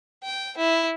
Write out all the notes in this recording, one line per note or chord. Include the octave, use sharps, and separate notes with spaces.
G5
E4